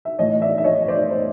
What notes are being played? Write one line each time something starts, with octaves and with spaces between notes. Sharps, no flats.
E5
A2 E3 C#5 D#5
D5 E5
E5
C#5 D#5
C5 D5
C5